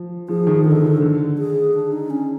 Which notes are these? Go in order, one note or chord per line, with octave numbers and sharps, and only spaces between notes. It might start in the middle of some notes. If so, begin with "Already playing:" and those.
Already playing: F3
F3 G#4
D#3
D3 A4
D3
D3
G#4
D4
D#4
C#4